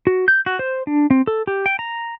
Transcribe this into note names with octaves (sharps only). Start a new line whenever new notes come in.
F#4
G6
F#4
C5
D4
C4
A4
G4
G5
A#5